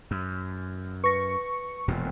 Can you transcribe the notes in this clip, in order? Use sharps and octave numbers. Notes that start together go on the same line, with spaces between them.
F#2
B4 C#6 A#6
E1 F2 A#2